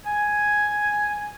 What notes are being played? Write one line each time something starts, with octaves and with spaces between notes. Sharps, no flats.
G#5